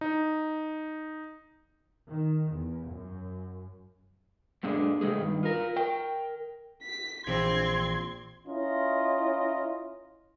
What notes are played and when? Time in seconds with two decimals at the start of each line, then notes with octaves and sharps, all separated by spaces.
0.01 D#4
2.09 D#3
2.53 E2
2.89 F#2
4.63 F#2 A#2 D3 G#3 D4
5.01 C3 G#3 A3 G#4
5.18 G2 D#3
5.43 F4 A#4
5.76 A#4 G5
6.83 B6
7.27 A#1 E3 C4 C6 E6 G#6
8.46 C#4 E4 F4 A#4 D#5